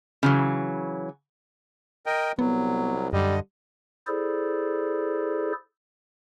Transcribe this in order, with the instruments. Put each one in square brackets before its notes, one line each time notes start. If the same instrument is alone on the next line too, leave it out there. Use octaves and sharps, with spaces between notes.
[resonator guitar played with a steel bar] C#3 E3 F#3
[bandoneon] A#4 D#5 G5
[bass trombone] C2 [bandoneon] F#3 [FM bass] B3
[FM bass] F#2 [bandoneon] D3 D#5 [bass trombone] G3
[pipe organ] E4 G#4 A4 C5 D5